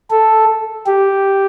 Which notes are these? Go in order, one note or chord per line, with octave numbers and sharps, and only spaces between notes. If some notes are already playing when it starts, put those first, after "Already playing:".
A4
G4